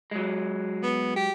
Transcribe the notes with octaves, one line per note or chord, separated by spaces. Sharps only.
F#3 G#3
B3
G4